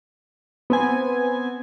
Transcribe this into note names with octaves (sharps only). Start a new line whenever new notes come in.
B3 C4 G#5